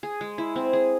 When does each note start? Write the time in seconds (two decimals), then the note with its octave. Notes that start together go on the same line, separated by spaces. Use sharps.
0.03 G#4
0.21 G#3
0.38 E4
0.56 C4
0.73 G#4